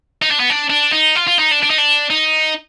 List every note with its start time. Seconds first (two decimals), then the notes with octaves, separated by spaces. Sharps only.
0.22 D#4
0.31 D4
0.40 B3
0.50 D4
0.70 D4
0.93 D#4
1.16 F4
1.28 F4
1.39 D#4
1.52 D4
1.63 D4
1.70 D#4
1.78 D4
2.10 D#4